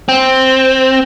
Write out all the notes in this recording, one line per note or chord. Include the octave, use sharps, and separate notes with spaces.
C4